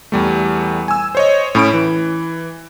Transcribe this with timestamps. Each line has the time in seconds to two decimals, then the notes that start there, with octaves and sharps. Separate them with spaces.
0.12 E2 G3 A3
0.88 G#5 E6
1.15 C5 C#5 D#5
1.55 A2 C#4 B5 D7
1.74 E3